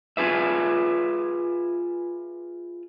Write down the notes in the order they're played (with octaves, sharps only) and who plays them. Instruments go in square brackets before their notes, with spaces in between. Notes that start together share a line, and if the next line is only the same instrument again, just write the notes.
[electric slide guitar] F4 G#4 B4 E5